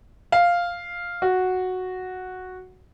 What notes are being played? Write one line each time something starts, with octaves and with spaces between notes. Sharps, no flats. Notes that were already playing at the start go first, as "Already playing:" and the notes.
F5
F#4